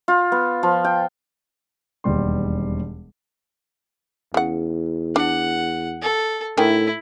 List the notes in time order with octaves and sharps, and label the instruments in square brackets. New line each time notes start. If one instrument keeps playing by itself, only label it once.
[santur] F4
B3
F3
G5
[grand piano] E1 D#2 B2 G3 G4 C6
[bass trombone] E2 [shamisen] C#3 F#5
[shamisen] D4 [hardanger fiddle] F#5
[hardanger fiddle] A4
[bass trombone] A2 [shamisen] D3 D#3 G#5 [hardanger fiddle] E4